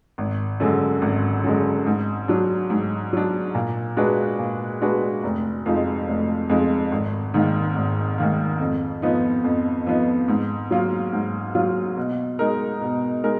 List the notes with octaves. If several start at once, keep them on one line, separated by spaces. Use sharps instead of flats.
G#1
F#2 D3 G#3
G#1
F#2 D3 G#3
G#2
F#3 D4
G#2
F#3 D4
A#2
G#3 D4 F#4 B4
A#2
G#3 D4 F#4 B4
F1
F2 F3 G#3 D#4
F1
F2 F3 G#3 D#4
G#1
G#2 D#3 A#3
G#1
G#2 D#3 A#3
F2
F3 B3 D#4
F2
F3 B3 D#4
G#2
F#3 A#3 F4
G#2
F#3 A#3 F4
B2
G#3 D#4 A#4
B2
G#3 D#4 A#4